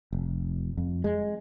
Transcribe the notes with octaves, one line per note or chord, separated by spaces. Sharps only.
F1
F2
G#3